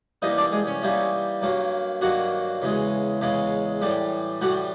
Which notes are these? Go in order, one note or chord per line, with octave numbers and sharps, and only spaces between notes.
E3 G3 A#3 D#4 D#5
D4 D5
G#3 G#4
C#4 C#5
E3 G3 A#3 D#4
G2 D#3 F#3 A#3
G2 D#3 F#3 A#3 F#4 F#5
E2 C#3 E3 G#3
E2 C#3 E3 G#3
A2 E3 G3
A2 E3 G3 F#4 F#5